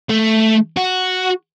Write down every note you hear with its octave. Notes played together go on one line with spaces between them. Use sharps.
A3
F#4